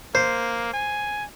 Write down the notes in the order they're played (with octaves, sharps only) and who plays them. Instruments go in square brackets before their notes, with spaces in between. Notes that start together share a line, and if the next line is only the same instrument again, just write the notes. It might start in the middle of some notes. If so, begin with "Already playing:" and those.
[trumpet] A#3 [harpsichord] C5
[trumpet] G#5